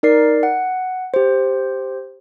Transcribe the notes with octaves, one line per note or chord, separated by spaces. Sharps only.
D#4 A#4 D5 C7
F#5
G4 C5